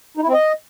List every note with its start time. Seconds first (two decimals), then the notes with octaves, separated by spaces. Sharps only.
0.17 D#4
0.23 E4
0.28 C4
0.33 D#5